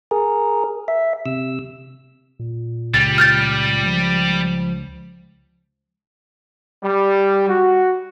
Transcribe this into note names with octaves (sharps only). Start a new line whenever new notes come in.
G#4 A#4
E5
C3 E6
A#2
C#2 G3 A6
F6 G6 A6
F3
G3
F#4